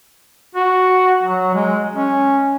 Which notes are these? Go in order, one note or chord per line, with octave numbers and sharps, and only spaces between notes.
F#4
F#3
G#3
C#4